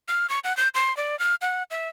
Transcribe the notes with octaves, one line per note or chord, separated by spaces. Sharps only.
F6
C#6
F#5
G6
C6
D5
F6
F#5
E5